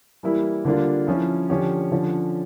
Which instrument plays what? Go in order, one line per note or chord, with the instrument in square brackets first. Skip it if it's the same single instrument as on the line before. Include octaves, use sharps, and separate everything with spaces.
[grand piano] E3 G3 A#3 E4
D3 G3 A#3 D4 F4
F3 C#4 E4
D3 F3 C#4 G4 C#5
D3 F3 C#4